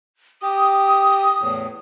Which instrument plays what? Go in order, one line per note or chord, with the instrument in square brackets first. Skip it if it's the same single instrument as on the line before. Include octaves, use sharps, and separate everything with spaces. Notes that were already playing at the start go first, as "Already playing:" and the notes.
[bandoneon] G4 [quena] D#6
[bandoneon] E2 A2